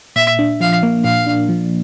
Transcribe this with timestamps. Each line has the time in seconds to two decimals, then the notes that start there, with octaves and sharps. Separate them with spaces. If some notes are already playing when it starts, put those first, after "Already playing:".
0.16 A#2 E5
0.39 D4
0.60 F3 F5
0.83 A#3
1.04 A#2 F5
1.27 D4
1.49 F3